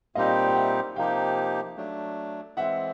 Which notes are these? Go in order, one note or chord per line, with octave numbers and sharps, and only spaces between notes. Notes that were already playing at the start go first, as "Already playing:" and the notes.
A#2 G3 C4 D#4 G4 D#5 F5
G5
E5 F#5
C3 F3 A#3 D#4 G4 F5 G5
F#3 A3 D4
E3 G#3 C4 E5 F#5